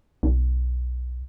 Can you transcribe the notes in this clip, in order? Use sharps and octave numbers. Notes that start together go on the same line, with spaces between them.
B1